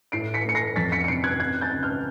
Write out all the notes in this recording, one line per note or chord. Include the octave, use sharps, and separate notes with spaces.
A2 C7 D7
B6 C#7
A3 C#7
A#6 C7
F2 A6 B6
B6 C#7
C#7
C3 C7 D7
F#6 G#6
C4 F#6 G#6
G6 A6
C#2
F6 G6